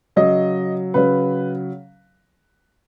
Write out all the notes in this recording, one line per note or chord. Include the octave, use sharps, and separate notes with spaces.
C#3 F#3 D#5
C#3 F#3 B4